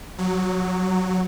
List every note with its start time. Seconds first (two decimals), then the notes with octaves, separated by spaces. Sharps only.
0.18 F#3